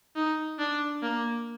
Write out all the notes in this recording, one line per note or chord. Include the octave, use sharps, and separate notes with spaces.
D#4
D4
A#3